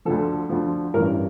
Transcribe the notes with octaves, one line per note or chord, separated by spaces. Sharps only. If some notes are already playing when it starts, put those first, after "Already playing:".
D2 D3 F3 A4
D2 D3 F3
A1 G2 E3 A#4